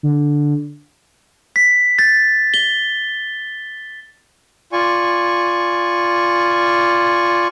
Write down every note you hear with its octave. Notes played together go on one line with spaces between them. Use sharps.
D3
B6
A6
G7
F4 D5 G#5 C#6